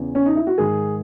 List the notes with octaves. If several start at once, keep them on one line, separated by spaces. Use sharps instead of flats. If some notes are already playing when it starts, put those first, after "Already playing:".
Already playing: E2 C#3 E3
C#4
D#4
E4
F#4
G#2 D#3 G#4